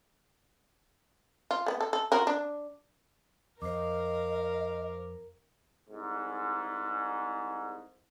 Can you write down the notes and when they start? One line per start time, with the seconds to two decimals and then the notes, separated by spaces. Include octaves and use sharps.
1.51 F4
1.66 A3 B3
1.81 A4
1.93 A4
2.12 F4 F#4 A#4
2.27 D4
3.62 F2 A#4 C5 D#5 F5 D6
5.89 C2 G#2